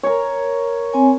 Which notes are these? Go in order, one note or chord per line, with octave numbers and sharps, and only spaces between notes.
A#4 C#5
C4 C#5 G#5